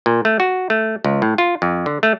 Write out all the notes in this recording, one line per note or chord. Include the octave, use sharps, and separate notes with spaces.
A#2
A3
F#4
A3
C#2
A2
F4
F2
D3
A3